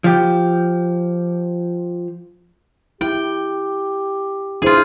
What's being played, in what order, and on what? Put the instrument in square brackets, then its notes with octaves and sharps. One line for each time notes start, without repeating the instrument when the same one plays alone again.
[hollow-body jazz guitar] F3 G4
[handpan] E4 [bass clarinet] G4 [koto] G5
[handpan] D4 E4 C5 [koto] F4 G#4